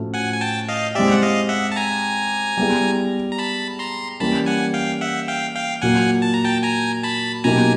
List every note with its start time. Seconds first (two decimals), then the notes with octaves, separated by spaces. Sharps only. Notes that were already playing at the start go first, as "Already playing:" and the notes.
Already playing: A2 F3 A3 C#4 F#4
0.14 F#5 G#5
0.33 G#5
0.41 G5 A5
0.68 D#5 F5
0.95 G#3 C4 E4 G4 D5 E5
1.11 F#5
1.22 D#5 F5
1.49 E5 F#5
1.72 A5
1.76 G#5 A#5
2.57 G3 B3 E4 G#4
3.32 A#5
3.38 A5 B5
3.79 A#5 C6
4.20 E3 G3 A#3 C#4 A5 B5
4.46 F#5 G#5
4.74 F5 G5
5.01 E5 F#5
5.28 F5 G5
5.55 F5 G5
5.82 A#2 F#3 A#3 F#5 G#5
6.22 A5
6.34 A#5
6.45 G5 A5
6.63 G#5 A#5
7.03 A5 B5
7.44 B2 F#3 A#3 D#4 G4 G#5 A#5